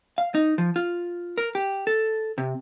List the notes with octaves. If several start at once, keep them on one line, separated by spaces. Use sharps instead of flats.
F5
D#4
F3
F4
A#4
G4
A4
C3